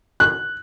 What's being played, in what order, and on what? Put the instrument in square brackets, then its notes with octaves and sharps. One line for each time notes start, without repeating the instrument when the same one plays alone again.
[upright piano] F#6